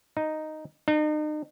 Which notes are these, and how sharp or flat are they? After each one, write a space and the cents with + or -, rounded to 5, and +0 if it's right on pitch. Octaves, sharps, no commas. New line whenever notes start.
D#4 -5
D#4 -40